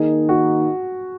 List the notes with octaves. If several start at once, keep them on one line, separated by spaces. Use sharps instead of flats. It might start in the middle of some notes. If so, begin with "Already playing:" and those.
Already playing: D#3 A#3 D#4 G#4
F#4